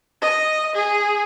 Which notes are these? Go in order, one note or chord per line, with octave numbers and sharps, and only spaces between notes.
D#5
G#4